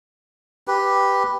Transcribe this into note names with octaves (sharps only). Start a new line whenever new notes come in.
G4 B4